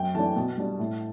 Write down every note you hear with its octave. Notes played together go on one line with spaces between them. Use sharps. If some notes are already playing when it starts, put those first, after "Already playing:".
Already playing: F#2 G5
E3 A3 D4 A5
B2
G3 D4
A2